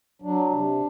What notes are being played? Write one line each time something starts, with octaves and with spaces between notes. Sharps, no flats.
F#3 D4
C3